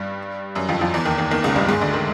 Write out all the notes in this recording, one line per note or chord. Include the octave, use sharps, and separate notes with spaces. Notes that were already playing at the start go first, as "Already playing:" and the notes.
Already playing: G2 G3
F#2 F#3
F2 F3
F2 F3
E2 E3
D#2 D#3
D#2 D#3
D#2 D#3
C#2 C#3
G2 G3
G#2 G#3
D2 D3
D#3